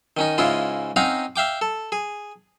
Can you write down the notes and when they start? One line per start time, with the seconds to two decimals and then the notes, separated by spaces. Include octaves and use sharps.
0.17 D#3 C#4 D#4
0.38 G#2 C#3 G#3 C#4 E4 F4
0.96 C4 C#4 D#4 F5 F#5 A#5
1.36 E5 F5 G5 D6
1.61 A4
1.92 G#4